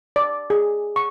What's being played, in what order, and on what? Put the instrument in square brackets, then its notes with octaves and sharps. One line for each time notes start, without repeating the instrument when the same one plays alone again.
[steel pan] D5
G#4
C#6